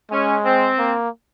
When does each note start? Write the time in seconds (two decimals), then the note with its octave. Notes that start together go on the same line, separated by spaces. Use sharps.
0.11 G#3 C#4
0.45 C4
0.79 A#3